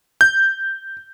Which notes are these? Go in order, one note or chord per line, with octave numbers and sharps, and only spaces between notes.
G6